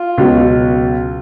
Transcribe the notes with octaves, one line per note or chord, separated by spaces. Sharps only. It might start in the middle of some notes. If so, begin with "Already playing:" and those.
Already playing: F4
C#2 B2 F#3